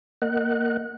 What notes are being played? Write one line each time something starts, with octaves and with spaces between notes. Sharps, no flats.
A#3 A#4 D#5 F#5 F#6